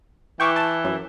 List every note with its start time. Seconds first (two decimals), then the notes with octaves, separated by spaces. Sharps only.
0.40 E3 G5 C#6 D6
0.56 A5
0.84 F#2